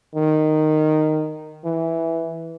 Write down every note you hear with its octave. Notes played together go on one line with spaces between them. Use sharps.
D#3
E3